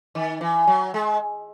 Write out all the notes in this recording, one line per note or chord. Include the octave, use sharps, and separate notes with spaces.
D#3
E3
F#3
G#3